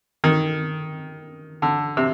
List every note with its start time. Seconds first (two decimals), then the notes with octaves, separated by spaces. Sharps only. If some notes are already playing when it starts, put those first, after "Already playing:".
0.24 D#3
1.62 D3
1.97 C3